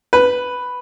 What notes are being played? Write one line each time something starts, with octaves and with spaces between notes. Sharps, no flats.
B4